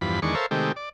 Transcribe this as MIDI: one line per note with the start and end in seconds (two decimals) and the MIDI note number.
0.01 0.20 40
0.01 0.20 43
0.01 0.20 53
0.01 0.20 83
0.22 0.35 40
0.22 0.35 51
0.22 0.35 56
0.22 0.35 62
0.22 0.35 85
0.35 0.46 69
0.35 0.46 70
0.35 0.46 72
0.35 0.46 73
0.35 0.46 76
0.35 0.46 77
0.51 0.72 48
0.51 0.72 51
0.51 0.72 56
0.51 0.72 57
0.51 0.72 67
0.76 0.89 74